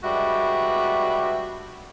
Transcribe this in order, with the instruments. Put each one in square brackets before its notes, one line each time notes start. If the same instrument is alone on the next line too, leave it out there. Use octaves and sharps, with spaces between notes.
[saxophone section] G3 G#3 D4 F#4 B4 E5